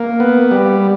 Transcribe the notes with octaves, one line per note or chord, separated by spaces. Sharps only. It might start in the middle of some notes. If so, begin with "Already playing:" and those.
Already playing: A#3
B3
G3